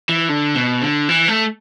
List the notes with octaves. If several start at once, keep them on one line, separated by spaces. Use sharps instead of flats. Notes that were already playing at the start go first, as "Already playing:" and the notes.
E3
D3
B2
D3
E3
A3